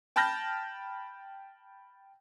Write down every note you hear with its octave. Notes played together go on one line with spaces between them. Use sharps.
G5 A5 B5 F6 G6 A#6